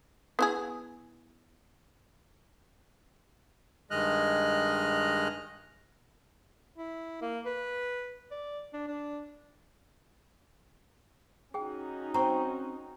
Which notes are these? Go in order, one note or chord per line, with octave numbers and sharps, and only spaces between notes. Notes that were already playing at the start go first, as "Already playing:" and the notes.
B3 E4 G#4
G2 D#3 G#3 D#5 F6 F#6
E4
A#3
B4
D5
D4
D4
C#4 D#4 F#4 G#4 G5
C4 A#5 C#6